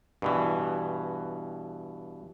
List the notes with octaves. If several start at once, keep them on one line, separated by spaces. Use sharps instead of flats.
G2 B2 E3